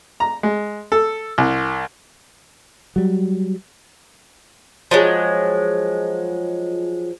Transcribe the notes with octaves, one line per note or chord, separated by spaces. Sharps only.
A#5
G#3
A4
C2
F#3 G3
F3 F#3 G#3